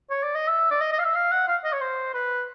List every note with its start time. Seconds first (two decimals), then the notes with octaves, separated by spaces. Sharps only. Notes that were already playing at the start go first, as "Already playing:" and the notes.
0.10 C#5
0.23 D5
0.35 D#5
0.48 E5
0.71 D5
0.81 D#5
0.92 D#5
0.98 F5
1.04 E5
1.15 F5
1.32 F#5
1.48 F5
1.64 D#5
1.73 C#5
1.81 C5
2.14 B4